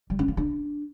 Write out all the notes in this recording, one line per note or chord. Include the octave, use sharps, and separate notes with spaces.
G3
C#4
A#3
D4